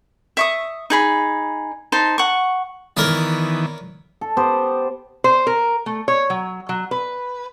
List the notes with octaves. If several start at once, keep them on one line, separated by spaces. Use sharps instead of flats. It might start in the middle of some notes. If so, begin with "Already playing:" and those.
E5 C#6 D#6
D#4 G#4 B5
D#4 C5 A5
F#5 C#6
D#3 E3 B3 A#4 C#5 D5
A4
B3 G4 C5
C5
A#4
A3
C#5
F#3
F#3
B4